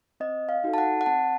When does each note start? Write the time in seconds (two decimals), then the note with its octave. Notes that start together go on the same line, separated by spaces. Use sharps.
0.20 C4 D#5
0.49 F5
0.64 D#4 F#4 A4
0.74 A5
0.78 F#5
1.01 F#5
1.06 C4 A5